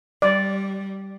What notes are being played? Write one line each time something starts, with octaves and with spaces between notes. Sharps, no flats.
G3 D5